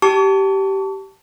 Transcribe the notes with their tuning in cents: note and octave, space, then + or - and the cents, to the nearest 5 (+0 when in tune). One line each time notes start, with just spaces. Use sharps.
G4 -15 A5 +10 C#6 +45